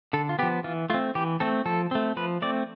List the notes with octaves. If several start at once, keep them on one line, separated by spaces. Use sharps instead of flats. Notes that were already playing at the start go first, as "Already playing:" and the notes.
D3 A4
F4
F3 B3 G4
E3 F4
A3 C4 F4
E3 G4
A3 C4 A4
F3 A4
A3 C4
F3 B4
A3 C4 D5